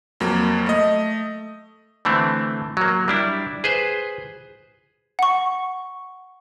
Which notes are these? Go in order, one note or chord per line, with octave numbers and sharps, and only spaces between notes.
F2 F#3 A#3
A3 D#5
D3 E3 A3 C4
F#3 A#3
G3 D4 E4
G#4 B4 C5
F#5 C#6